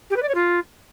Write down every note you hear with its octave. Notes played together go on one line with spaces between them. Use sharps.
G4
B4
D5
C#5
F4